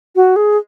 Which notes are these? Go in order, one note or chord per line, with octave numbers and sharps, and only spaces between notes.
F#4
G#4